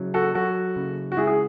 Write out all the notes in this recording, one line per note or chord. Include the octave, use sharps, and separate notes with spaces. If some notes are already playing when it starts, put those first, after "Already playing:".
Already playing: C#3 F#3
F#4 A4
F#3 F#4 A4
C#3
F#4
G#3 E4 G#4
G#4